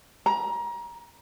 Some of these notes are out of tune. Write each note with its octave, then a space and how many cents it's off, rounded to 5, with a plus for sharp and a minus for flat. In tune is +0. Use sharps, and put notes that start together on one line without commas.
A#5 +30